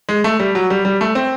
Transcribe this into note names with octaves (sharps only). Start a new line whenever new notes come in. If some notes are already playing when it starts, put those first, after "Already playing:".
G#3
A3
G3
F#3
G3
G3
A3
C4